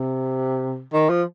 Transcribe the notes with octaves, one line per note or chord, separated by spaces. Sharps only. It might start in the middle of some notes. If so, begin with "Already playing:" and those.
Already playing: C3
D#3
F3